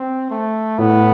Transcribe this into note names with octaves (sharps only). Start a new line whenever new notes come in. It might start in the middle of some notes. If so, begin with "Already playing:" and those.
Already playing: C4
A3
A2 B3